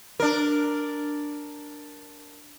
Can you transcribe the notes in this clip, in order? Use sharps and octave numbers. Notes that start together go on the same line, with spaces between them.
D4 A#4